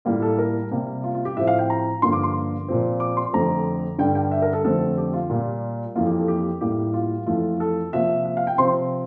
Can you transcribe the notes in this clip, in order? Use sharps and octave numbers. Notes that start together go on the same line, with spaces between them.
A2 G3 A#3 F4
A4
A#4
C3 G3 A#3
F4
F4
G4
A2 F3 C4 E5
F5
G5
A#5
G2 D3 F3 A#3 C6
D6
C6
A#2 F3 C4
D6
C6
F2 D3 A3 C4 A#5
G2 D3 G3 G5
G5
E5
A#4
A4
F2 D3 A3 C4 A4
G4
F4
A#2 G3 A#3
F2 E3 A#3 F4
G4
A4
G4
A2 G3 A#3 G4
F4
F2 E3 A3 F4
A4
C3 F3 A#3 E5
E5
F5
G5
C3 F3 C4 C6